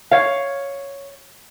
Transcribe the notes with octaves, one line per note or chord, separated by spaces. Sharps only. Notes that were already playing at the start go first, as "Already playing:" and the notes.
C#5 F5